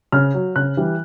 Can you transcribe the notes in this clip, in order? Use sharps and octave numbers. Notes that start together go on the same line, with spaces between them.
C#3 F6
F#3
C#3 F#6
E3 G3